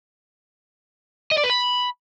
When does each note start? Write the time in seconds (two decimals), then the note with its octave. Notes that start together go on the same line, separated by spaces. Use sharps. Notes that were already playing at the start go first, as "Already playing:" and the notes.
1.31 D#5
1.37 D5
1.44 B4
1.50 B5